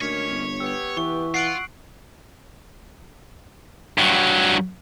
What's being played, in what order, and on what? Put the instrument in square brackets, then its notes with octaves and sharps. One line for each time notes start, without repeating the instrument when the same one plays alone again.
[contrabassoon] D2 [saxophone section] D#3 A#3 C#4 [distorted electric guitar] C#5 [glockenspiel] B6
[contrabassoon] G1
[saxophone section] B3 G4 [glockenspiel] E6
[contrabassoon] E3 [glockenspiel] C#6
[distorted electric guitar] F4 [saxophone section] F#5 [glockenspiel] C7 D7 F#7
[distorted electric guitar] G2 F#3